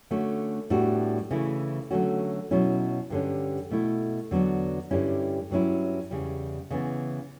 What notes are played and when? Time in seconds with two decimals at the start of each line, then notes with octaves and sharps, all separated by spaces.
0.11 D3 A3 C#4 F#4
0.70 A2 G3 B3 D4 F#4
1.31 C#3 E3 A3 E4
1.91 D3 F#3 A3 C#4 F#4
2.51 B2 F#3 C#4 E4
3.10 G2 D3 G3 C#4
3.71 B2 A3 E4
4.31 E2 D3 F#3 B3 D4
4.91 G2 D3 G3 C#4 E4
5.50 G2 F#3 C#4 E4
6.11 E2 C#3 G3
6.70 C#3 E3 B3